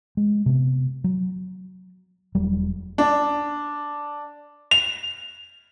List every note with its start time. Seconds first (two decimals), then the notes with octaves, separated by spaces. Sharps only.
0.17 G#3
0.46 C3 B3
1.04 F#3
2.35 E1 F#3 G3
2.98 D4
4.71 F7